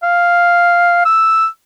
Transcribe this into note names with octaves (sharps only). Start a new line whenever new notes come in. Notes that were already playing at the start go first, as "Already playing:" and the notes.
F5
E6